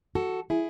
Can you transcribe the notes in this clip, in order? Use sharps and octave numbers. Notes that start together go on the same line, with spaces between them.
F#4 A4
E4 G#4